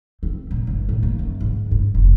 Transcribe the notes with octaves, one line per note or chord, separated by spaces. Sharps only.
C4
A#2
G1
A2
A#3
F#2
G#2
G2
F1